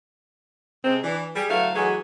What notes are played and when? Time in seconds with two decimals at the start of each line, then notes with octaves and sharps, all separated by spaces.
0.85 C3 G#3 C4
1.03 E3 D4
1.36 G3 G#4
1.49 D3 F#3 A3 E4 B4 F5
1.75 E3 F#3 G#3 A3 F#4 G#4